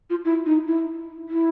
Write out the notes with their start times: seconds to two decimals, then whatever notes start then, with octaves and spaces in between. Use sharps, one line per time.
0.10 F4
0.25 E4
0.46 D#4
0.67 E4
1.29 E4